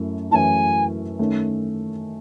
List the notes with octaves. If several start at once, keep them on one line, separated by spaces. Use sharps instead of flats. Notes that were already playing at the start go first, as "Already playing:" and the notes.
Already playing: F#2 A3 C#4 E4
F#2 E3 A3 C#4 E4 G#5 A5
D#3 A3 C#4